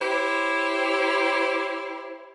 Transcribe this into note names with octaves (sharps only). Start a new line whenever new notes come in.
E4 G4 C5 C#5